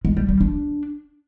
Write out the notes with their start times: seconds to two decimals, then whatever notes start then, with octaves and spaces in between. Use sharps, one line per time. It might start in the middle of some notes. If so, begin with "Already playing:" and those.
0.05 G#3
0.17 G3
0.29 G3
0.41 D4